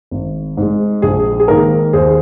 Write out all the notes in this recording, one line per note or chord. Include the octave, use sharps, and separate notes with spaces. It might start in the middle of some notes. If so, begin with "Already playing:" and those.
G#1
G#2
G#3
A#1 G#4
G#4
G#2 D#3 A#3 A#4
D#2 G#4 C5